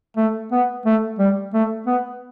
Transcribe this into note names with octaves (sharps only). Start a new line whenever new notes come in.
A3
B3
A3
G3
A3
B3